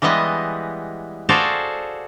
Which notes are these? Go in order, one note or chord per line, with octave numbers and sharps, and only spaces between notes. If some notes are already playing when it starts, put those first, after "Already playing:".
E3 G3 G#3 B3 D#5
F#4 G#4 A4 C5 D5 F5